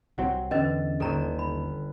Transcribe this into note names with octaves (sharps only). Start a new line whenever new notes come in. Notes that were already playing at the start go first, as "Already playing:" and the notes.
C2 F#3 C4 F#5
E2 D3 C#4 B4 C5 D#5 A6
G1 D#2 D3 A4 A#5 C#6 E7
B5